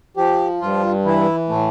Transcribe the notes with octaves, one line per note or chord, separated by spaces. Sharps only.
F3 G4
G2 F4
E3 E4
A2 A3